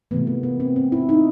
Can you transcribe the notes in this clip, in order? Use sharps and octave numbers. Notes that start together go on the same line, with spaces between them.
C3 E3 A3 B3
A#3
B3
C4
C4
E4
D#4